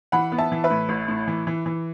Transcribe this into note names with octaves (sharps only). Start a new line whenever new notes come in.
E3 F#5 B5
B3
E5 A5
E3
B4 E5
A2
A1
A2
E3
E3
E3